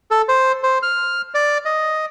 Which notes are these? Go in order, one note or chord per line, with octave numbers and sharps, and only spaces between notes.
A4
C5
C5
F6
D5
D#5